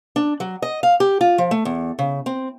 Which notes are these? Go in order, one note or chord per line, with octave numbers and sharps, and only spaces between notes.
D4
F#3
D#5
F5
G4
F4
F3
A3
E2
C#3
C4